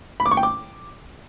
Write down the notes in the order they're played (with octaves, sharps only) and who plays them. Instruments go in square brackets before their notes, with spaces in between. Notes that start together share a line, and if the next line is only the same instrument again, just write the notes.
[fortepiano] B5
D6
C#6
G5
D6